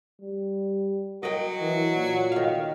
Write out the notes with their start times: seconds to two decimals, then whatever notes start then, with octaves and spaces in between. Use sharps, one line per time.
0.21 G3
1.23 F#3 A#4 D#5 G5
1.60 E3
1.95 A#2
2.32 D#3 F5